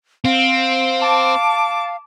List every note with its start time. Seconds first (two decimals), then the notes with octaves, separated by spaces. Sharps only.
0.25 C4 F5 D7
1.02 A5 D6